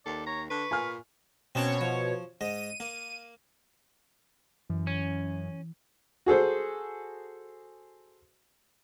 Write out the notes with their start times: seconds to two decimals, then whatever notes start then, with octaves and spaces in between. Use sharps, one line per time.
0.06 D#2 A4 D5
0.27 C#5 A#5
0.51 D3 B4 C#6
0.71 A#2 G#5 F6
1.55 B2 C4 C#4 C#5 A5
1.81 F3
2.41 G#2 D#5 D#7
2.80 A#3
4.70 F#2 E3
4.87 C#4
6.26 F#4 G#4 A4 C5